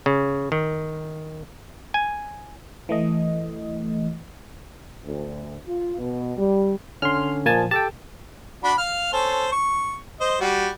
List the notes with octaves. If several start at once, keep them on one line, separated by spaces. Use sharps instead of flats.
C#3
D#3
G#5
E3 A3 D#5
D2
F4
B2
G3
D3 C#4 C6 F6
A#2 F3 A#3 G#5 A5
G4 A4 G5 A5
D4 F#4 B5
F5 F6
C#4 A4 C5
C#6
C5 D#5
G3 F#4